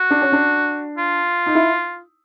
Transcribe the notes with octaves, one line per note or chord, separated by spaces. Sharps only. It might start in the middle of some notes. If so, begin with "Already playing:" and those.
Already playing: F#4
D4
C#4
D4
F4
D#4
E4